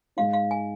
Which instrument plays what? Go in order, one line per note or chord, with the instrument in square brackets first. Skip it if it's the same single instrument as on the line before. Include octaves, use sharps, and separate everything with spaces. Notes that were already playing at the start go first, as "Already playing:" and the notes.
[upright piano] G#2 G#3 D#4 [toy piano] F5
[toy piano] F5
G#5